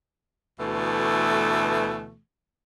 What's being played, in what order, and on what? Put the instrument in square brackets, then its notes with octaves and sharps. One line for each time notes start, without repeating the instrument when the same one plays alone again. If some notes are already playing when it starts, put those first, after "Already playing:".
[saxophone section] D2 B2 E3 A3